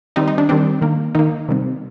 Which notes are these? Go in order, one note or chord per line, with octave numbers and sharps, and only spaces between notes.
D#3 G3 C4 D#4
D#4
D4
D#3 G3 C4 D4
D#3 A#3
D#3 A#3 D#4
C3 D#3 G3 C4